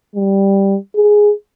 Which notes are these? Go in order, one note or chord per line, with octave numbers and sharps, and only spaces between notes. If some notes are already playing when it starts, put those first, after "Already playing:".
G3
G#4